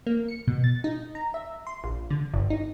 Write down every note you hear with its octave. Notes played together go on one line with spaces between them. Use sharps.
A#3
C#7
B2
A6
D#4
A#5
E5
C6
A#1
D3
G1
D#4